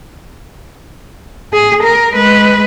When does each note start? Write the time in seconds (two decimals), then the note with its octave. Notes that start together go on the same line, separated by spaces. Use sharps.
1.53 G#4
1.83 A#4
2.13 G#3 B4